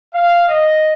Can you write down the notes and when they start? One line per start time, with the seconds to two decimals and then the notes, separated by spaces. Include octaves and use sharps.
0.14 F5
0.48 D#5